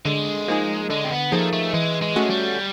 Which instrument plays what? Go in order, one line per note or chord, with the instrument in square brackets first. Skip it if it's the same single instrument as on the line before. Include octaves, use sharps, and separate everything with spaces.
[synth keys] D3 [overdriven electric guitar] G#3
[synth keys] F3 A#3 D#4 G#4
[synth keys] D3 [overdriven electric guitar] G#3
[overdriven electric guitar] C4
B3
[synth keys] F3 A#3 D#4 G#4 [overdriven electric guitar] A3
[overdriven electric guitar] A3
[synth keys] E3 [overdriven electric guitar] G#3
[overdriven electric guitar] G#3
[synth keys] A3 C#4 F#4
[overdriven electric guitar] G3